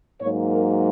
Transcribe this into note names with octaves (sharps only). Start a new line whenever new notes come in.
G#2 F#3 A#3 C#5
A#4